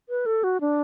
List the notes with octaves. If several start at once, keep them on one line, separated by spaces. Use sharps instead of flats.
B4
A4
F#4
D4